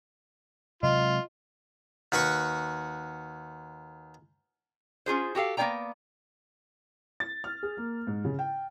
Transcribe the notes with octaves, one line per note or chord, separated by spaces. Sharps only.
C3 F#3 G#3 F4 D#5
D#2 F#4 B4 F#5 C#6
C#4 F4 G#4 C5
F#4 G4 A4 F5
A#3 B3 E4 D5 G5 A#5
A6
F6
G#4
A#3
G#2
C#3
G5